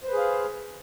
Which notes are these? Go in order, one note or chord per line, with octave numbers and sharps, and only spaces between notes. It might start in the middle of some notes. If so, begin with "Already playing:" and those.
G#4 B4 C5 F5